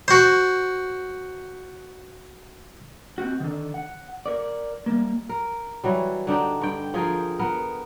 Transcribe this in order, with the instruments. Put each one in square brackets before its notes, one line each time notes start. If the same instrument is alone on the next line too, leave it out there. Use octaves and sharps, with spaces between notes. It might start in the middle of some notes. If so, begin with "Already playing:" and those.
[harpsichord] F#4 C5
[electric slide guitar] C4 F#4
D3 D#3
F#5
A#4 D5
G3 A#3
[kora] A#4
E3 F#3 G3
D3 D4 D#4 G4
G2 G5
F3 G#4 A#4 G5
B3 A#4